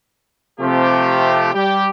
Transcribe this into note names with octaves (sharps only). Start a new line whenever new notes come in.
C3 F3 A3 G4
G3 G4